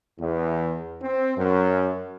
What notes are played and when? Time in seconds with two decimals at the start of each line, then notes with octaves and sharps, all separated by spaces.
0.20 E2
1.01 C4
1.37 F#2